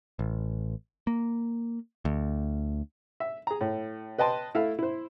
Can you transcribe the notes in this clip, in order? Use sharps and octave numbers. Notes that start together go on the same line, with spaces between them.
A1
A#3
D2
E5
G#4 A#5
A2
B4 D#5 G5 A5 C6
A3 E4 E5 F5
E4 C5